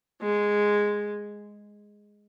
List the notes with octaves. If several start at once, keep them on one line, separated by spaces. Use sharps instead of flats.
G#3